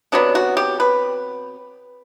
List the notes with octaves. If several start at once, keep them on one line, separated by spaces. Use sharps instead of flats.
C3 F#3 B3 D4
F#4
G4
B4